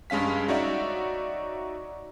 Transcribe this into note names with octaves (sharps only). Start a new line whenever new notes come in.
G2 G#3 C#4 F5 B6
D#4 F#4 C#5 D5 E5